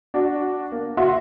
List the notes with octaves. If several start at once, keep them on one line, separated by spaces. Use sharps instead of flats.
D4 F#4
A#3
F#4 E5 F#5 C6